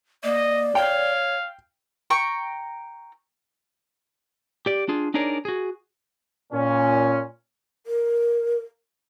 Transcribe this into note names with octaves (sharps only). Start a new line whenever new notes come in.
A#3 D5 D#5
C#5 F5 G5
G5 A#5 C#6
G4 D5
D4 F4 G#4
D4 D#4 G#4 A#4 C#5 D5
F#4 G#4
A#2 C#4
A#4